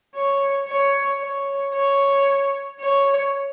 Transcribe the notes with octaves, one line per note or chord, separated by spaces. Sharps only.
C#5
C#5
C#5
C#5
C#5